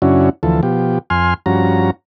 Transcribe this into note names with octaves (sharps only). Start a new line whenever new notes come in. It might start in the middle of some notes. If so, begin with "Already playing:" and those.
F#2 C#3 C#4 D4 E4 F#4
D2 E3 F3 A4
B2 F3 G4
F2 G#5 C6 F6
G2 F3 C#4 F#4 A#5